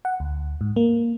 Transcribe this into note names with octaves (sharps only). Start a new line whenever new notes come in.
F#5
D2
G#2
A#3